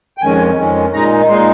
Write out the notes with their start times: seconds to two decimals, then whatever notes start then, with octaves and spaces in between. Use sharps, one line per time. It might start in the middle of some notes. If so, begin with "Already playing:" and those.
0.18 G5
0.22 F2 D#3 G#3 C#4 G#5
0.58 F2 D#3 G#3 C#4
0.93 A#2 G#3 D#4 A#5
1.29 A#2 G#3 D#4 C6